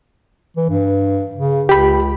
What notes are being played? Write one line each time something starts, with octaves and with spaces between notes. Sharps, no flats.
E3
G2
C#3
C#2 G4 B5